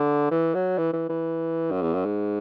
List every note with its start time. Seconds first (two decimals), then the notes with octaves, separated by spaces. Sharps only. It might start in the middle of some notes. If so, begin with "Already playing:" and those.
Already playing: D3
0.31 E3
0.54 F#3
0.78 E3
0.93 E3
1.09 E3
1.71 F#2
1.82 E2
1.94 F#2
2.05 G#2